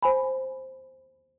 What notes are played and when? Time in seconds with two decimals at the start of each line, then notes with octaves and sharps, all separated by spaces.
0.03 C5 G#5 B5